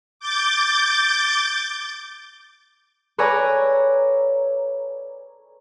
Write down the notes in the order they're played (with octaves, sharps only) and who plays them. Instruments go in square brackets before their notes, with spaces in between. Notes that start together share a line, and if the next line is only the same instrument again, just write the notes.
[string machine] D6 G6 A6
[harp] A4 B4 C#5 D5 G#5 A#5